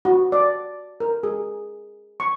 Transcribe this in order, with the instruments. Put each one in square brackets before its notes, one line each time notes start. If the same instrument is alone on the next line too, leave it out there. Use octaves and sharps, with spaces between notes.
[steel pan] F#4
D5
A#4
G#4
C#6